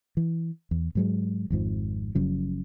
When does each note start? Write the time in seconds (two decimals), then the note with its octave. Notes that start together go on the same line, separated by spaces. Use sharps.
0.17 E3
0.71 E2
0.95 G#2 F#3 G#3
1.50 G#1 F2 G#2 F3
2.15 F#1 F#2 C#3 F3